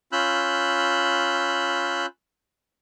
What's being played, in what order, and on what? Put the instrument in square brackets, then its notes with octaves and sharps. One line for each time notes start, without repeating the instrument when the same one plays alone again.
[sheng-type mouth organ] C#4 F4 B5 E6 F#6 G6